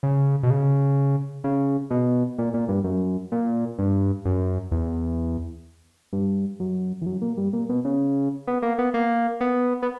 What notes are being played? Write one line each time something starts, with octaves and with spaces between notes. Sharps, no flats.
C#3
B2
C#3
C#3
B2
A#2
A#2
G2
F#2
A#2
G2
F#2
E2
G2
F#2
E2
F#2
A#2
G2
A#2
B2
C#3
B3
A#3
B3
A#3
B3
B3